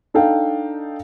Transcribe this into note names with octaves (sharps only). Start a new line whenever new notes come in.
D4 D#4 A4 F5 G5